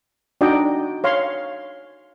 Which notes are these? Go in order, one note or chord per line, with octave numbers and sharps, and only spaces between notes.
D4 D#4 F#4 D5 D#5 G5
C#5 F5 C6